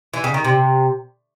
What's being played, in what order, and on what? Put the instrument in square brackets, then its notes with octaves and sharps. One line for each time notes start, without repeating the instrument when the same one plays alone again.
[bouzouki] E3
C#3
D#3
C3